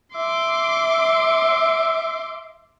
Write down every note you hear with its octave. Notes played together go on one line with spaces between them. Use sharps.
E5 C6 D6